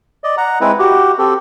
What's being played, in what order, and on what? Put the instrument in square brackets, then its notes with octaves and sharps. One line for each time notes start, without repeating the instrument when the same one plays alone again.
[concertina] D5 D#5
F#5 A#5
G#3 C4 E4 B4
F#4 G4
C4 G4 A4